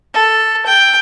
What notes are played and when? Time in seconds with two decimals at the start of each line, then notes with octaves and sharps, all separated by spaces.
0.14 A4
0.66 G5